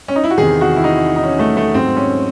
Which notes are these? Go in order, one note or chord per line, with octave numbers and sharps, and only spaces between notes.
C#4
D#4
E4
F#4
E2 C3 D#3 G#4
F#4
E4
D#4
D#4
C#4
A3
A3
G#2 F#3 C4
C#4